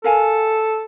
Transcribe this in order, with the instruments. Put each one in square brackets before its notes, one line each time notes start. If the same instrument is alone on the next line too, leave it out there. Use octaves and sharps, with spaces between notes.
[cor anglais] A4 [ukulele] A#4 F5 G#5